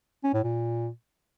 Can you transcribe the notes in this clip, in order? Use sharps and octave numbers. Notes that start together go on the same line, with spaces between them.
C#4
A2
A#2